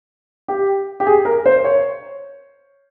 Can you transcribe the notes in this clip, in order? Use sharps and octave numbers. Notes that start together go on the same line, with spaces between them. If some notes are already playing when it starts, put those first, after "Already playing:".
G4
G4
G#4
A#4
C5
C#5